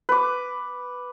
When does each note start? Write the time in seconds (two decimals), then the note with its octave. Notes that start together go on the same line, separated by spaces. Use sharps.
0.09 B4 D6